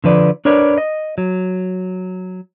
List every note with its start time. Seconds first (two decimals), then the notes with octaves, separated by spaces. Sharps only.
0.04 D3 F3 B4 D5
0.45 D4 A#4 B4 C#5 D5
0.78 D#5
1.18 F#3